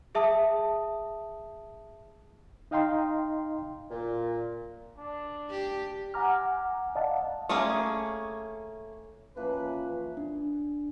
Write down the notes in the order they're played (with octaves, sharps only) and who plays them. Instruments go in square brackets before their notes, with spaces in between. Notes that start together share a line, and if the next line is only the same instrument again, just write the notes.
[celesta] G#4 E5 A5 D#6
[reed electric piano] D#4 D#5 F5 G5 A#5 C6
[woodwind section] A#2
[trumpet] D4
[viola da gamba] G4
[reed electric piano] F#5 G#5 A#5 D6 F6
D5 D#5 F5 F#5 A5
[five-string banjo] A3 A#3 C#4 G#4
[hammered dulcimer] E3 F3 A#3 [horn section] C#4 B4
[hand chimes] D4